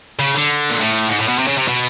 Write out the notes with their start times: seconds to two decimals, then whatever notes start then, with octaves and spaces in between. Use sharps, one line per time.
0.19 C#3
0.35 D3
0.70 A#2
0.79 A2
1.09 G#2
1.19 A2
1.28 B2
1.39 C3
1.48 C#3
1.57 C3
1.68 B2